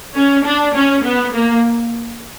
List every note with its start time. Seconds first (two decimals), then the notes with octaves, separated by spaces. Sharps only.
0.16 C#4
0.45 D4
0.75 C#4
1.04 B3
1.33 A#3